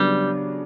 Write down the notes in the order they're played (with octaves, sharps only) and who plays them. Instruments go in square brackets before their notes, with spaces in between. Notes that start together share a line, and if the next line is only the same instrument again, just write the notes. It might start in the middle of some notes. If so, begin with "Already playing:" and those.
Already playing: [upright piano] C#3 F#3 B3 D4 [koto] G3